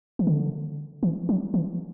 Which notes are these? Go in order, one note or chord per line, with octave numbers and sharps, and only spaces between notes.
E3
D3
E3
F#3
E3